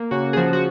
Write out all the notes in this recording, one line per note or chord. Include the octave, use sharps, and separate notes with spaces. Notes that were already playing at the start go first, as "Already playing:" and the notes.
Already playing: A#3
C#3 F#4
G#4
F3 F#4
F#4